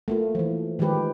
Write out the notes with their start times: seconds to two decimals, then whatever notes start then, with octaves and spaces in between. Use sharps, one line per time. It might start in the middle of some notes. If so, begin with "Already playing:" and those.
0.08 A3 A#3 F4
0.35 E3 F3
0.79 D#3 F3 G#3 G4 B4